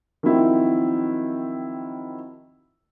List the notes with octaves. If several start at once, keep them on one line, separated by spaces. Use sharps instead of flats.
D#3 F3 F#3 C4 E4